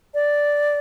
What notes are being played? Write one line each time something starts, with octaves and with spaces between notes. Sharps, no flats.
D5